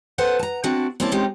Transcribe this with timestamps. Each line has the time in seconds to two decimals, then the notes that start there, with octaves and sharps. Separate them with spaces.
0.18 A4 B4 C5 F#5
0.39 A5 A#5
0.64 C4 D4 E4 F#4 D5
1.00 A#3 C4 C#4 E4 D5 A5
1.12 G#3 C4 C#4 D#4 G4